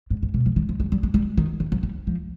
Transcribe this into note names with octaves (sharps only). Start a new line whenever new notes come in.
G#2
G#2
B2
F3
D#3
F3
G#3
G3
G#3
G3
D#3
D#3
F3
G3
F3